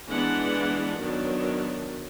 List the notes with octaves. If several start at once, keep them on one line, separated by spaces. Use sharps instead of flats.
E3 G#3 B3 D4 F#5
D#3 F#3 B3 D4